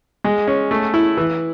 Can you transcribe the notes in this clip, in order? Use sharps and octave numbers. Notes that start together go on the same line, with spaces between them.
G#3
C#4
A3
E4
E3